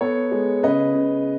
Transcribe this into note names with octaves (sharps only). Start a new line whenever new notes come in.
B3 A4 C#5
G#3
C#3 B4 D#5
C#3